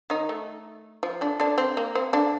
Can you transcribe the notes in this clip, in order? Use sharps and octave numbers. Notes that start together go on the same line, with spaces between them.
D#3 D#4
A3
F3
D3 D4
D3 D4
C4
A#3
C4
D3 D4